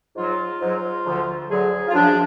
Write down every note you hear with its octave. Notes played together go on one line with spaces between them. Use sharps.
G#2 F#3 F4
G#2 F#3
D2 D3 F3
D2 D3 F#3 G#4
F4
F#2 F3 D4